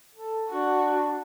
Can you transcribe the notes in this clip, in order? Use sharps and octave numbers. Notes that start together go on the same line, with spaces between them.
A4
D4 F#4